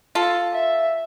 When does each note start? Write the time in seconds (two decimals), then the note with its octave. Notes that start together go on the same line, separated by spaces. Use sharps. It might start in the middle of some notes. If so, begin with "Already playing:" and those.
0.15 F4 A4
0.53 E5